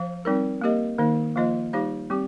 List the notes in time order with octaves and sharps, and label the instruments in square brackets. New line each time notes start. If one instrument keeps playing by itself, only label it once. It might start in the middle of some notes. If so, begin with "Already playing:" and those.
Already playing: [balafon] F3 C5 F5
G3 C4 D#4 A#4
A#3 G4 A#4 D#5
D#3 A#3 D#4 C5
F3 A#3 F4 C5 D#5
G3 D#4 G4 C5 F5
G3 C4 G4